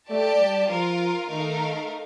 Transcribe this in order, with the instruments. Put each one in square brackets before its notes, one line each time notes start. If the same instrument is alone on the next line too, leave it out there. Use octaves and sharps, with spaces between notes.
[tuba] A3 [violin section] G4 D5 A5
[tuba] G3
[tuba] F3 [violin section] F4 A#4 F5
[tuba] D#3 [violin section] A3 D#4 A#4 F5